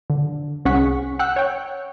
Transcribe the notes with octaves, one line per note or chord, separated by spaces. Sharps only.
D3
C2 C#4 G#4 F#5 C#6 B6
F#5 G5 E6 F#6
C#5 G5